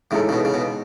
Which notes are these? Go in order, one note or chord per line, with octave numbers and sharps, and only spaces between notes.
A2 C#3 E3 G#3 D#4 A4
C#3
B2
C#3
B2